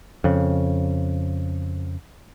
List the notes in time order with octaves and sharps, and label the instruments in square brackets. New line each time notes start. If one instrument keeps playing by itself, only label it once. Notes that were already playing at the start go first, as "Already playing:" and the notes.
[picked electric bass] F2 C#3